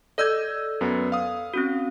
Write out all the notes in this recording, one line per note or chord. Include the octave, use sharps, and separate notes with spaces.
A4 D5 D#5 E6 G6 G#6
F#2 B3
F5 D#6
C4 C#4 F#4